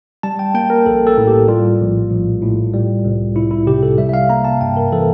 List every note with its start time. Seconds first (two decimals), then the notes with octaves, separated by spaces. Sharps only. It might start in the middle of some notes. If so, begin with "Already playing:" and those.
0.23 G3 A5
0.39 G5
0.54 A#3 G5
0.70 A#4
0.86 A#1 A4
1.07 A4
1.17 A2
1.27 G4
1.48 G3 F4
1.80 A#1
2.10 A#1
2.42 A2
2.73 G3
3.05 C2
3.36 C2 E4
3.51 E4
3.66 C3 G4
3.83 A4
3.98 G3 E5
4.09 E5
4.14 F5
4.30 A#3 A#5
4.45 A5
4.61 G2 G5
4.77 A#4
4.93 E3 A4